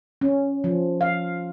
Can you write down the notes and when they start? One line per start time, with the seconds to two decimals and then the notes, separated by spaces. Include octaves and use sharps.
0.21 C#4
0.64 F3
1.01 F5